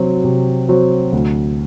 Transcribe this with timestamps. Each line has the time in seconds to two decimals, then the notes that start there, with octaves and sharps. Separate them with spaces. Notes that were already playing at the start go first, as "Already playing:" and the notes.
Already playing: C3 F#3 C4 F#4
0.24 C3
0.69 F#3 C4 F#4
1.12 D2